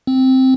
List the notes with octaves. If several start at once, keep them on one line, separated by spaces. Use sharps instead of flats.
C4